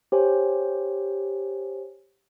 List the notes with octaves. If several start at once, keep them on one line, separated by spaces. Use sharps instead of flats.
G4 C5 C#5 G#5